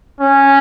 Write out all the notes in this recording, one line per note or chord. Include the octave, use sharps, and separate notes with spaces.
C#4